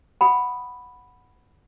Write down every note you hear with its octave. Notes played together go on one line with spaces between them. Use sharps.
F#5 G5 B5 D#6